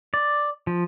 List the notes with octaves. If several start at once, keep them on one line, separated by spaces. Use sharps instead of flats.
D5
F3